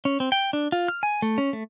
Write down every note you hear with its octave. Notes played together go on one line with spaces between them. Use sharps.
C#4
C4
G5
D4
F4
F6
G#5
A3
C#4
A3